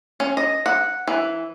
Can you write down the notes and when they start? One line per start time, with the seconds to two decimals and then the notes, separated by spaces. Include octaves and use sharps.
0.20 C#4
0.37 D#5
0.66 F#5
1.07 E3